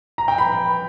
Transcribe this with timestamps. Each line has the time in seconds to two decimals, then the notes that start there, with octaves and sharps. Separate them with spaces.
0.18 A#5
0.28 G5
0.38 B5